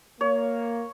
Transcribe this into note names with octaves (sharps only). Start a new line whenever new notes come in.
A#3 C#5